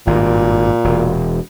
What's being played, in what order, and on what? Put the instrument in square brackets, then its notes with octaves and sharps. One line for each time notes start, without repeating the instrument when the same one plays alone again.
[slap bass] G#1 G2 [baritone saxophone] A#2
[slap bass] E1